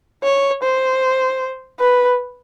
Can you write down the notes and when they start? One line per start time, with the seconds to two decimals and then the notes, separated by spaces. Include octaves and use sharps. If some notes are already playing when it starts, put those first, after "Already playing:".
0.24 C#5
0.63 C5
1.80 B4